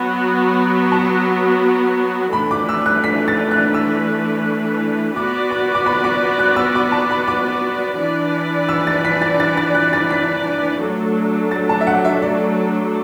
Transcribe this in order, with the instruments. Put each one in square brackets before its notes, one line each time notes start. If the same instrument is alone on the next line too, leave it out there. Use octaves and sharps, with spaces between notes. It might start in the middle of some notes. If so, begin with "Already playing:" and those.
Already playing: [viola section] F#3 B3 F#4
[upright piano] A5
[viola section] E3 A3 D4 B4 [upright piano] B5
[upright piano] D6
E6
F#6
B6
A6
F#6
E6
[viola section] B3 F#4 B4 D5 [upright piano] D6
[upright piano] D6
D6
B5
D6
F#6
E6
D6
A5
B5
D6
[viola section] E3 D4 B4 D5
[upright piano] E6
A6
B6
A6
A6
A6
F#6
A6
B6
[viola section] F#3 A3 D4 A4
[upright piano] A6
A5
E5
F#5
E5
D5